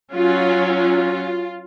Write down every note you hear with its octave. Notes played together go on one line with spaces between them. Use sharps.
F#3 C#4 F4
F4